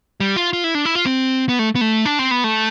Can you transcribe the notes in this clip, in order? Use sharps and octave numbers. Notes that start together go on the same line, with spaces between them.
G3
F4
F4
E4
D4
E4
F4
C4
B3
A3
B3
A3
D4
C4
B3
A3